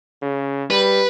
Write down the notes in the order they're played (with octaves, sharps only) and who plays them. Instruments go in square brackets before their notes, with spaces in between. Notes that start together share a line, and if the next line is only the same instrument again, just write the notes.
[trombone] C#3
[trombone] G3 [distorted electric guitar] B4